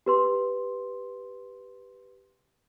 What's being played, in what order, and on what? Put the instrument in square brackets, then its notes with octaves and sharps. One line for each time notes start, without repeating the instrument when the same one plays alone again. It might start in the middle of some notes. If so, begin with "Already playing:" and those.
[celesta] G4 B4 C6